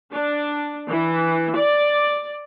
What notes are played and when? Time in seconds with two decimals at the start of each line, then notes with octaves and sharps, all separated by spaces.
0.11 D4
0.89 E3
1.56 D5